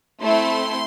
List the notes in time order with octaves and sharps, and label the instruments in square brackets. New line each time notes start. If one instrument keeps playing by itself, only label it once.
[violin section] A3 C4 E4 C6